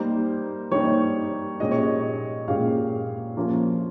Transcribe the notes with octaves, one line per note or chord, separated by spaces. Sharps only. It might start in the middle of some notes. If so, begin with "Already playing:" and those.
Already playing: G3 A#3 D#4 G4 C5
G3 A#3 D#4 G4 C#5
A#2 G#3 C#4 G4 D#5
C#5
D#5
A#2 G#3 C#4 G4 F5
F3 A#3 C#4 F4